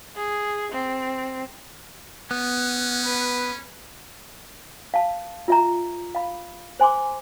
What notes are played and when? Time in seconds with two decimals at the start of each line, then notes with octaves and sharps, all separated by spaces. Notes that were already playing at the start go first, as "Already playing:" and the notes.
0.16 G#4
0.72 C4
2.31 B3 C#4
3.05 B4
4.94 F5 A5
5.48 F4 E5 A#5
6.15 F5 B5
6.80 C5 G#5 C6 D6